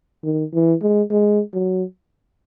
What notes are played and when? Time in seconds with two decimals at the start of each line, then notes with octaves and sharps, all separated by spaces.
0.24 D#3
0.54 E3
0.82 G#3
1.11 G#3
1.53 F#3